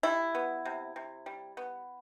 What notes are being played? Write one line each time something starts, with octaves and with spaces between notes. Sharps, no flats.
G3 E4
B3
C3
C3
G3
B3